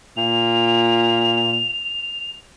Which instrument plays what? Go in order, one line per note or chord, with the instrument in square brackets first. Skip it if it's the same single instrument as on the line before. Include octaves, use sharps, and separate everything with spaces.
[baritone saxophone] A#2 [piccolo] F7